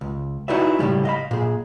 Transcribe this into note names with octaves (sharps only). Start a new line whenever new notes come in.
C#2
D#4 E4 F#4 B4 D5 E5
A2 C#3 G3 G#3
D#5 F5 B5
A#2 G#4